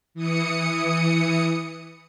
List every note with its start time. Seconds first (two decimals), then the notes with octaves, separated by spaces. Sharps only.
0.14 E3 D#6 C#7